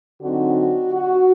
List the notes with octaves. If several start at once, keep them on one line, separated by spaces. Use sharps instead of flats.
D3 F#3 C4 D#4 F#4
F#4